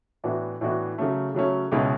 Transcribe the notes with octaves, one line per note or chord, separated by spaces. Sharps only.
A2 E3 B3 D4 F#4
A2 E3 B3 D4 F#4
C#3 F#3 A3 C#4
C#3 F#3 A3 C#4
C#2 B2 G#3 C#4 E4